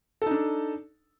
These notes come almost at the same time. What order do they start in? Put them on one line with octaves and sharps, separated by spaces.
A4 D#4 D4